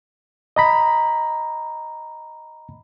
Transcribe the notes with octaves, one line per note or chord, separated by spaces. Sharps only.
D#5 A#5 B5